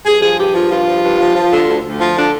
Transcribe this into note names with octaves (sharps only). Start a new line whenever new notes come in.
G2 G#4
F3 G#4
G2 G4
F3 F4
G2 F4
F3
G2
F3
F3
D3
D2
D2
F3 F4
D3 D4